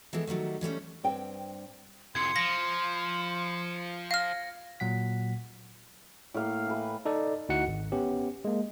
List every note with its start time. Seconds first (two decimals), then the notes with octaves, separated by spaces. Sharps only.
0.13 E3 G#3 B3 A4
0.27 D#3 F#3 G3 A3
0.61 E3 G3 A3 C#4
1.04 G2 C4 G5
2.15 C2 F2 C6 G#6 C7 C#7
2.36 F3 A#6 C#7 D7
4.11 F5 F6 A#6
4.80 A#2 F#3 F#5 B6
6.34 A2 A#3 F5
6.67 E3 B4
7.05 D#4 A4 D5
7.49 D2 D#4 E4 F#4 F#5 C#7
7.68 G#1
7.92 B3 C#4 G4
8.45 G#3 A#3